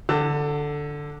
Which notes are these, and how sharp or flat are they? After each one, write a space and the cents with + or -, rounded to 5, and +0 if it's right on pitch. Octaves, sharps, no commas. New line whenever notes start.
D3 +0 A5 +40 E6 +0